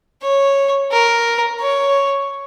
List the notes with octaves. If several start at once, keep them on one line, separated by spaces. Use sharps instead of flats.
C#5
A#4
C#5